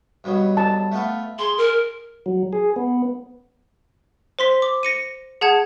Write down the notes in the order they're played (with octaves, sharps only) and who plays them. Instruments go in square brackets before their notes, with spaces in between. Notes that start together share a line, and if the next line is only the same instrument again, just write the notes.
[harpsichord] G2 B2 F#3
[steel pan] A5
[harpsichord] A3 B3 F4
[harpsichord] G#4 [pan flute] C6
[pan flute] A#4
[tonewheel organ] F#3
G#4
B3
[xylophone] C5 C6 B6
D6
A#6 C#7 D#7
G#4 F#5 A5 G#6